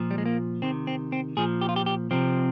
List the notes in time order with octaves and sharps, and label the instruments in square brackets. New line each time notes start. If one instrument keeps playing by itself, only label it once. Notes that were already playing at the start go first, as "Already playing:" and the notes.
Already playing: [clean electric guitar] A#2 F3
G3
G#3
A#3
C3 D#3 C4
C4
C4
A#2 F3 G#4
G4
F4
G4
G4
C3 F3 C4